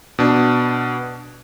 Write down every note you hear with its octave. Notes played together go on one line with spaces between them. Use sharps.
B2 D4